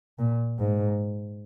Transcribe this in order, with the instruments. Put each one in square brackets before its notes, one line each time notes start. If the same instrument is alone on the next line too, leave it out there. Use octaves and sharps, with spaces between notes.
[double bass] A#2
G#2